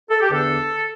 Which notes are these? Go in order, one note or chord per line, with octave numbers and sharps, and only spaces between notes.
A4
G4
E2 D3 B3 D4 A4